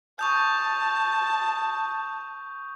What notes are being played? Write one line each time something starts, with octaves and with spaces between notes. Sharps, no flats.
A5 C#6 D#6 G6